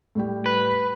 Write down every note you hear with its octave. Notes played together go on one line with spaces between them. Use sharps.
A2 G3 G4
B4